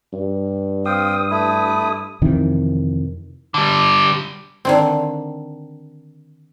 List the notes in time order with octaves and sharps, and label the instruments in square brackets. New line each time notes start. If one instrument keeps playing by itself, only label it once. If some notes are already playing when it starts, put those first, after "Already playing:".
[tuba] G2
[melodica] C4 F5 G5 [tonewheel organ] D#6
[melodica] A3 E4
[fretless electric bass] F2 C3 D#3 E3
[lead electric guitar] D3 G3
[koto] D3 D#3 C4